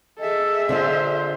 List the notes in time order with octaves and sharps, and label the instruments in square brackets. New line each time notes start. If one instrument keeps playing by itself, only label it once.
[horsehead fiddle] G#4 E5 [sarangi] A4 [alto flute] D#5
[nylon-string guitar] D3 D4 F4 [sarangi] C5
[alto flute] D5